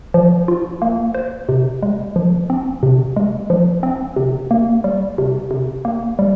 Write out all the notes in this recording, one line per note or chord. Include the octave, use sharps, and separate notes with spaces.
F3
F4
A#3
C5
C3
G#3
F3
C4
C3
G#3
F3
C4
C3
A#3
G3
C3
C3
A#3
G3